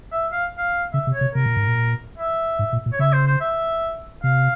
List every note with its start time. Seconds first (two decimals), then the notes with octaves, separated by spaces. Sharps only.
0.12 E5
0.32 F5
0.58 F5
0.93 C#3 E5
1.07 C3
1.14 C#5
1.21 C3
1.35 C3 A#4
1.46 A#2
1.57 G#2
1.67 A#2
2.18 E5
2.59 G#2
2.73 A#2
2.86 A#2
2.92 C#5
2.99 C#3 E5
3.13 C5
3.27 C5
3.41 E5
4.23 C3 F5